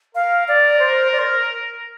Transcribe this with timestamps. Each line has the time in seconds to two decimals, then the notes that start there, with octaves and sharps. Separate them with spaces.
0.15 A#4 F5
0.48 D5
0.79 C5
1.12 D5
1.19 C5